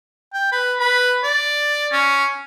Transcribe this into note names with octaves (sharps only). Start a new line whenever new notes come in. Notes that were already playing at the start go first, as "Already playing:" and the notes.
G5
B4
B4
D5
C#4